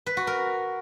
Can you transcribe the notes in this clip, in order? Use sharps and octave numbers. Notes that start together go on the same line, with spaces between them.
B4
F#4
A#4